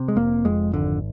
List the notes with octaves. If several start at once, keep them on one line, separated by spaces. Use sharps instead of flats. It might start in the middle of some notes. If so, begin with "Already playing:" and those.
Already playing: C3
G#3
F1 A#3
F2 G#3
G#1 D3